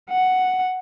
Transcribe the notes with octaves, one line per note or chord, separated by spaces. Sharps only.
F#5